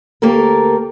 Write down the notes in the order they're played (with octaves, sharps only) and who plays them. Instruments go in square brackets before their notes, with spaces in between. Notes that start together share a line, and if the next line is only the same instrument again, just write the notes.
[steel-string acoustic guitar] D2 A#3 G4 A4 A#4